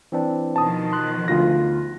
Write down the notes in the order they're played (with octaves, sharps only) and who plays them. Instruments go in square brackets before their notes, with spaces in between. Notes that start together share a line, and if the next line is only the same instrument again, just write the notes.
[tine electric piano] E3 C4 D4
[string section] B2 D#3 F3 [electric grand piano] A5 D#6
[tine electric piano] C6 F#6
[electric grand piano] D2 F4 A#6